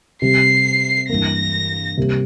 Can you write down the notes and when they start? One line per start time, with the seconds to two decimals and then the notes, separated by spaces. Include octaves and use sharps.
0.22 C3 G3 C4 C7
1.09 G2 E3 A#3 A#6
1.97 C3 G3 A#3